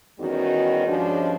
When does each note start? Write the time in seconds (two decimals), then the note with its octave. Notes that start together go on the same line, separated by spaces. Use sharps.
0.19 E2 D#3 G3 C#4 D#4 F#4
0.87 G2 F3 G#3 C#4 D4